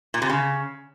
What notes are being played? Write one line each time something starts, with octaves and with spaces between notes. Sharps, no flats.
A#2
C3
C#3